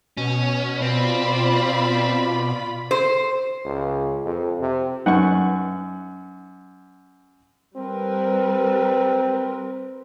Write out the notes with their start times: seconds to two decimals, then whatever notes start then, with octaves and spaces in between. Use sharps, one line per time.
0.17 B2 C#4
0.82 C4 F4 D5 B5
2.91 C5
3.65 C#2
4.25 F2
4.61 C3
5.06 F#2 D#4 B4 F#5 C#6
7.77 G3 C4 A#4 B4